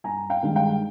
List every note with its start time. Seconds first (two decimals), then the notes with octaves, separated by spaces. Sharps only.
0.04 G1 G#5 A#5
0.30 F5 G5
0.43 G2 D#3 G#3
0.55 F5 G5